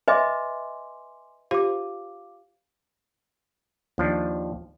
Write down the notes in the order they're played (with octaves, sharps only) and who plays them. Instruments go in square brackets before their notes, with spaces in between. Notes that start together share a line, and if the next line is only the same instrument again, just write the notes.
[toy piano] B4 D#5 E5 [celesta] G#5 C6 D6
[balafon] F4 G4 C5 [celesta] F5 D6
[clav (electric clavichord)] D#2 F3 D4